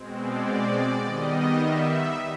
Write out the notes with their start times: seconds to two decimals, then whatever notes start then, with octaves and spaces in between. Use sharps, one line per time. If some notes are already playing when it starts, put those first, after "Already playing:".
Already playing: B2 G#3 C4
0.17 D5
1.01 D#3 G3 B3 D#5
1.57 E5